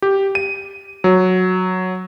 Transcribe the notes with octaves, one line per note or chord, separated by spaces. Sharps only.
G4
D#7
F#3